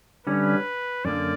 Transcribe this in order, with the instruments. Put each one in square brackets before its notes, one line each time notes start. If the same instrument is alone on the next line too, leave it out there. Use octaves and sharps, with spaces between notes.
[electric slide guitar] D3 G3 C#4 [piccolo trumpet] B4
[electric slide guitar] F#2 D3 A#3 [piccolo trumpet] D5